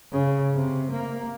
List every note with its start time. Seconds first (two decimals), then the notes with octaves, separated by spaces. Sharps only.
0.12 C#3
0.55 C3
0.91 A#3